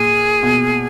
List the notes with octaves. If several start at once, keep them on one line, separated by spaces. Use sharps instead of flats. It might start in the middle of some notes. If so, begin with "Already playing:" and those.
Already playing: A#2 G#4
B2